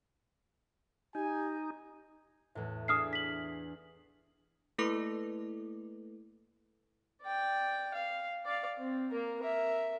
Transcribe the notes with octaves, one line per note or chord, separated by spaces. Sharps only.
D#4 G4 G#5
E2 A2
D4 G#4 E5 D#6 F6 C7
B6 F#7
A3 A#3 E4 A4 B4 D6
D5 G5
F5
D5 F5
C4
A#3 A#4
A#4 E5